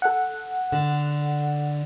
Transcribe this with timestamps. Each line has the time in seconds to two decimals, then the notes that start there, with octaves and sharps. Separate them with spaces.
0.02 A4 F#5
0.72 D3